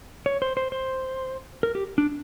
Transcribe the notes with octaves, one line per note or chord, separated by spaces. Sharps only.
C#5
C5
C5
C5
A#4
G4
D4